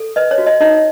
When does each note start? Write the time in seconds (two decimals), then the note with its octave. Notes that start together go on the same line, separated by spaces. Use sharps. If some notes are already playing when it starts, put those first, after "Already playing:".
Already playing: A4
0.16 B4 D#5
0.31 C#5
0.38 F#4
0.46 D#5
0.60 D#4 D#5